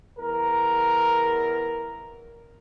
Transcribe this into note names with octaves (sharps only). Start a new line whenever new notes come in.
E2 A#4